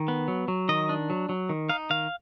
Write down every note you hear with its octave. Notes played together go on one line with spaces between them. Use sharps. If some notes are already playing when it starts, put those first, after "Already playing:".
Already playing: D#3
B3
F#3
F#3
D#3 D#5
D4
F#3
F#3
D#3
D#4 F5
D#3 F5